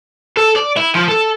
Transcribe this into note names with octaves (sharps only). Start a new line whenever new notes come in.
A4
D5
E4
F3
A4